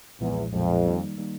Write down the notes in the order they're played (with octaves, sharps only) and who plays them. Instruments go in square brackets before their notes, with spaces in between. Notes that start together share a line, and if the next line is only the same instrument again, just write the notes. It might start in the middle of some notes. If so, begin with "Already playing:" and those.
[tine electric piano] B1 A#2 F3 G#3 [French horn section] E2
[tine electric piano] B1 A#2 F3 G#3 [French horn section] F2
[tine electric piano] D#3 G3 A#3 D#4
D#3 G3 A#3 D#4